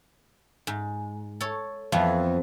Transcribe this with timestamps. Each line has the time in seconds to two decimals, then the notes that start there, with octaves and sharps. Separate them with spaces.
0.67 G#2
1.41 A4 C#5
1.92 F2 E3 B3